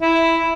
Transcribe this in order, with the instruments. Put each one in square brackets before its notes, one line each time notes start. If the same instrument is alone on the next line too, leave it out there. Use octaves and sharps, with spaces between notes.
[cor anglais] E4